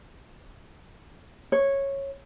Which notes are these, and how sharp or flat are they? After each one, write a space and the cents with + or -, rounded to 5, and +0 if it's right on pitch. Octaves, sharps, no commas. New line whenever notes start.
C#5 -10